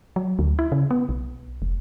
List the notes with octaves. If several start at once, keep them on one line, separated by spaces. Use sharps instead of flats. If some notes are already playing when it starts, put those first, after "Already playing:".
F#3
D2
E4
C#3
B3
B1
F1